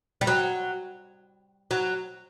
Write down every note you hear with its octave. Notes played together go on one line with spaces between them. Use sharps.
G3
F#3
F#3